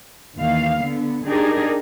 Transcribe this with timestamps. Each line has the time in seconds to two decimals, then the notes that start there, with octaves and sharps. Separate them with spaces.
0.36 D#2 E3 F5
0.79 D3 B3
1.26 D4 D#4 G4 G#4 A#4 D5